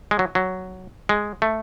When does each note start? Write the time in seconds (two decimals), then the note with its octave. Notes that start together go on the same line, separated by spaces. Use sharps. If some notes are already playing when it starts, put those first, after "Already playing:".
0.11 G#3
0.19 F#3
0.35 F#3
1.09 G#3
1.42 A3